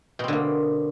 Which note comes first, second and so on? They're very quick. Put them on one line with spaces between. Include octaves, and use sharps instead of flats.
B2 C4 D3 A#3